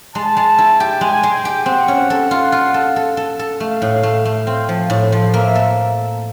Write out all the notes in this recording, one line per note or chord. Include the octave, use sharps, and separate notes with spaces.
G#3 A5
G#3
E4
G4
G#3 G#5
G#3
G5
G4
F#5
C4
C#4
A4
F4
F4
A4
A4
A4
A4
A3 F5
A2
A3
A3
C4
F3
A2
F3
A#3 E5
A4